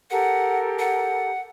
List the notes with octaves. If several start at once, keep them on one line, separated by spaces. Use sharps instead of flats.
G4 A4 A#4 F#5
F#5